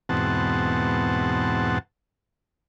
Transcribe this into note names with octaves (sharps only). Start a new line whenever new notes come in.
E2 G#2 B2 C4 F#5 A5